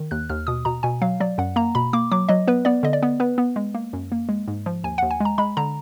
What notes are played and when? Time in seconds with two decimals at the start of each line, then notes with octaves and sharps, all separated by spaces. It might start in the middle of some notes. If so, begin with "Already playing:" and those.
Already playing: D#3
0.11 D#2 F#6
0.29 D#2 F6
0.47 B2 D#6
0.65 B2 A#5
0.83 B2 G#5
1.02 F#3 F5
1.20 F#3 D5
1.38 F#2 F#5
1.56 A#3 A#5
1.75 B2 B5
1.93 A#3 D6
2.12 F#3 D6
2.29 F#3 D#5
2.48 B3 B4
2.65 B3 D5
2.83 D3 D#5
2.93 D5
3.02 B3
3.20 B3 B4
3.38 B3
3.56 G#3
3.75 A#3
3.93 F#2
4.12 A#3
4.29 G#3
4.48 G#2
4.66 F3
4.84 D#2 G#5
4.98 D#2 F#5
5.11 G#5
5.20 G#3 A#5
5.38 G#3 B5
5.57 D3 A#5